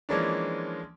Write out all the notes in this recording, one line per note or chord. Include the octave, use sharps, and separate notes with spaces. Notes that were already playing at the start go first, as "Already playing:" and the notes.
E3 F3 G#3 A#3 C#4 D4